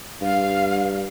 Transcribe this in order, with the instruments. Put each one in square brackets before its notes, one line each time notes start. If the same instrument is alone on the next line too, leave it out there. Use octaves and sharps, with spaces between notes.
[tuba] G2 [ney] F5